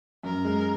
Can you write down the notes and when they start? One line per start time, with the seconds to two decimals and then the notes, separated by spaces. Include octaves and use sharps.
0.23 F#2 A#4
0.45 G#3